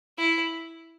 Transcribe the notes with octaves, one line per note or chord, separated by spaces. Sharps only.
E4